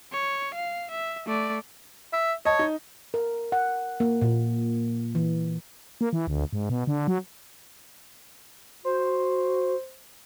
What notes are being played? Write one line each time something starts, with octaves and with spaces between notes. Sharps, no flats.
C#5
F5
E5
A3 D5
E5
C#5 D#5 A5
D#4
A#4
F#5
A#3
A#2
E3
A#3
E3
D2
G#2
B2
D3
F#3
F#4 C5